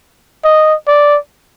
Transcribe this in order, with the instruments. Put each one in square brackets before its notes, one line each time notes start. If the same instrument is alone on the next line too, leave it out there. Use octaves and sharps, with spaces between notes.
[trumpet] D#5
D5